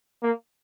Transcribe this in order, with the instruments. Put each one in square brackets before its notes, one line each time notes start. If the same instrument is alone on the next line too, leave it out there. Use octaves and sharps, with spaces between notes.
[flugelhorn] A#3